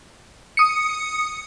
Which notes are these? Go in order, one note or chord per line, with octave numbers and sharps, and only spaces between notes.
D#6 C#7